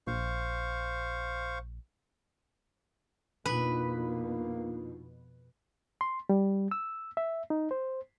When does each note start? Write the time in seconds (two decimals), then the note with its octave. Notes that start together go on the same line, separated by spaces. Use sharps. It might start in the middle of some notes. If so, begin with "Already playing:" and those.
0.07 A#1 C5 F5 C#6
3.46 F2 B2 A#3 D4 D#4 F4 B4
6.01 C6
6.29 G3
6.71 E6
7.17 E5
7.50 D#4
7.71 C5